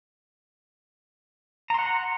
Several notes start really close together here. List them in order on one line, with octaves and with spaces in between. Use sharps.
A#5 C6 F#5